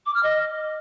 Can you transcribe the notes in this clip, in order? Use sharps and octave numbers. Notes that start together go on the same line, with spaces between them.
D6
F6
D#5